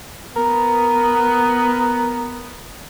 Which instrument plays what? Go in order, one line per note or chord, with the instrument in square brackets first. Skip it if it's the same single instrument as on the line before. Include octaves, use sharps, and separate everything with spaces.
[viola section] B3 [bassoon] A#4